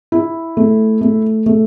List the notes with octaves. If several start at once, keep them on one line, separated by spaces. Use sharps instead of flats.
E4
A3
A3
A3